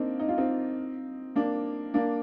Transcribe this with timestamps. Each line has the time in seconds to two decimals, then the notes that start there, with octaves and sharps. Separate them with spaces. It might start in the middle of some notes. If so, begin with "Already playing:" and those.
Already playing: A#3 C4 D4 D#4
0.19 D#4
0.29 F4
0.38 C4 D#4
1.36 A#3 D4
1.94 A#3 D4